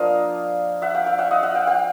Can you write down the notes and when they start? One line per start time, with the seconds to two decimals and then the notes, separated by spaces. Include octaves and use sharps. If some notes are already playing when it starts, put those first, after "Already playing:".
Already playing: F3 A#3 D4 F4 D#5 F5
0.82 E5 F#5
0.94 F5 G5
1.06 F5 G5
1.18 E5 F#5
1.31 D#5 F5
1.43 E5 F#5
1.54 F5 G5
1.67 F5 G5